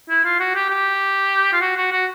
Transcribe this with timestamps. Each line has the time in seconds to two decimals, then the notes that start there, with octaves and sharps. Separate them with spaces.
0.09 E4
0.24 F4
0.40 F#4
0.55 G4
0.70 G4
1.53 F4
1.61 F#4
1.77 F#4
1.92 F#4